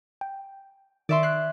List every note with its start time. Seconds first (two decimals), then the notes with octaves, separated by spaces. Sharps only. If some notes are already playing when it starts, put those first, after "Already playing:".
0.21 G5
1.09 D#3 D5 E5 C6 C#6
1.23 F#6 G#6 B6 C7